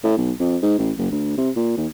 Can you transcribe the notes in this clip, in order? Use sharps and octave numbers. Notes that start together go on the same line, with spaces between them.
A2
B1
F2
G#2
A1
F#1
D2
C3
A#2
D#2